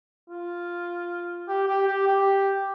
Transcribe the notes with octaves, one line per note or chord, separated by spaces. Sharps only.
F4
G4
G4
G4
G4